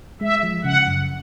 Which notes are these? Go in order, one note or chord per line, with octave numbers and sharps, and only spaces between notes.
G#3 E5
F3
C#3 F#5
F#2